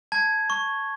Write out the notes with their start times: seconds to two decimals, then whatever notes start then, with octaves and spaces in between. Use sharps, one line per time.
0.12 A5 G#6
0.50 C#6